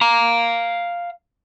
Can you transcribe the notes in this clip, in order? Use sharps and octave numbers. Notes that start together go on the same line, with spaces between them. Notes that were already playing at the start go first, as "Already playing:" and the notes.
F5 A#5